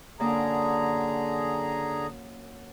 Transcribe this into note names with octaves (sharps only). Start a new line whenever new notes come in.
F#2 D3 A#3 G#4 D5 A#5